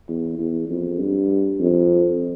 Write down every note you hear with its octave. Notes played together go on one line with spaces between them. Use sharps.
E2
E2
F2
G2
F2